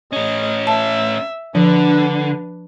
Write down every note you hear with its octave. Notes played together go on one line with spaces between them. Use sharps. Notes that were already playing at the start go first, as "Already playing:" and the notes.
A2 C#4 D#5
E5 A5
D3 F3 D4 B4